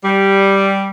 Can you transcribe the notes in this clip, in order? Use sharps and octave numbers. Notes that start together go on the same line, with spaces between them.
G3